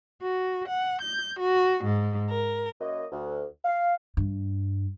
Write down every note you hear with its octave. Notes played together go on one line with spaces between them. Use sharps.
F#4
F#5
G6
F#4
G#2
A#4
F#2 A#3 C#5 D#5
D2
F5
G2